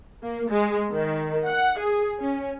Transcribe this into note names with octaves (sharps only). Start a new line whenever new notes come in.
A#3
G#3
D#3
F#5
G#4
C#4